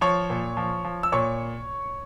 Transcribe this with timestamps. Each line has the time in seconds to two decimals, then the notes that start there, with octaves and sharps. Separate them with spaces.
0.01 F3 C#5 C#6
0.30 A#2
0.57 F3
0.84 F3
1.03 E6
1.12 A#2 C#5 C#6